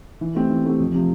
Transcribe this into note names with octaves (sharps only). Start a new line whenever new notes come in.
E3
A3 C4 G4
E3
A3 C4 G4
F2
C3 F3